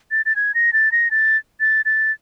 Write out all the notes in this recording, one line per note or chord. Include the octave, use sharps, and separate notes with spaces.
A6
A6
G#6
A#6
A6
A#6
A6
A6
A6